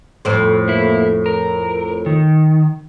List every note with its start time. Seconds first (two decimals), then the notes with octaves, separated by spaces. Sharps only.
0.25 F2 A2 C5
0.68 A#3 E4
1.26 A#4
2.06 D#3